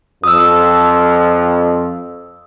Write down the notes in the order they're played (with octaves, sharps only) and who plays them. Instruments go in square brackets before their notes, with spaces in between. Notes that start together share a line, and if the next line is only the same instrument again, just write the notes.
[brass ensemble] F2 [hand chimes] D#6 E6